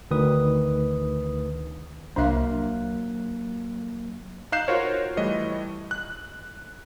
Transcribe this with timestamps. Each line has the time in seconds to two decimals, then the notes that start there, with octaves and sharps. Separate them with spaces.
0.11 D2 D#3 B4 D#6
2.16 C2 F#3 A#3 D4 C5 E5 F5 F#6
4.52 D#4 F5 F#6 G6 C7 E7
4.68 F4 F#4 A#4 C5 C#5
5.17 E3 G3 A3 D#5
5.91 F#6